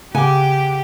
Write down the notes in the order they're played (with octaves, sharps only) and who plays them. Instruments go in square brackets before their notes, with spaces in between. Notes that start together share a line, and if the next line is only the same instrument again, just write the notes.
[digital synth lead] C#3 [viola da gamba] G4 [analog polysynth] F#5 D6 [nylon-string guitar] G#5